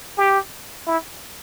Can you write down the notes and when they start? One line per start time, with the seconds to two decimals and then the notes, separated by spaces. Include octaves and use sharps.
0.18 G4
0.87 E4